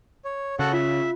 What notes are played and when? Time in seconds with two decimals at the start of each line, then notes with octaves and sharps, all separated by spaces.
0.25 C#5
0.59 C#3 F#4 A4 F#5
0.73 F4 E5